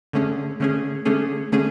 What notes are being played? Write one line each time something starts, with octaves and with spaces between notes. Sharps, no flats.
D3 A3 C#4 G#4
D3 A3 C#4 G#4
D3 A3 C#4 G#4
D3 A3 C#4 G#4